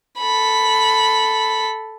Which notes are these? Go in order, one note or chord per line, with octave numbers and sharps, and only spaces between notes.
A4 B5